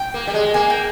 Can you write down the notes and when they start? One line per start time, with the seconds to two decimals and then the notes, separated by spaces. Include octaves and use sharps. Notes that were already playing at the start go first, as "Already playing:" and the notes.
Already playing: G5
0.14 A#3
0.27 G3
0.34 G#3
0.54 A#3 G#5
0.70 G5